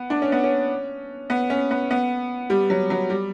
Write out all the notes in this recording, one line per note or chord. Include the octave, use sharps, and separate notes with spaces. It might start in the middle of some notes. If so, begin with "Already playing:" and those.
Already playing: B3
D4
C#4
B3
C#4
B3
C#4
B3
B3
G3
F#3
F#3
G3